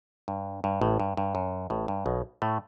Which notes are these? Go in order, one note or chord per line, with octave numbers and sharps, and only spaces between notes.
G2
G2
A1 A2
G2
G2
F#2
A1 A2
G2
B1 B2
A2 A3